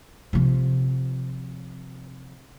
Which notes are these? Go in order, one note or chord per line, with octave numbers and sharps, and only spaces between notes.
C3 F3